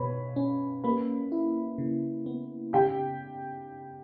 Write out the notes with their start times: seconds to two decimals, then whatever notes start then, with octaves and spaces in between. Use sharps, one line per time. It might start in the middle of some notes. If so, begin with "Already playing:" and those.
Already playing: B2 B4 C#5 B5
0.36 C#4
0.84 A#3 B4 B5
1.32 E4
1.78 C#3
2.26 B3
2.73 C#3 G4 G5